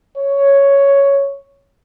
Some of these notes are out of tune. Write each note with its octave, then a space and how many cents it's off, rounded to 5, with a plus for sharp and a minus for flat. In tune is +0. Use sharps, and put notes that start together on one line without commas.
C#5 +5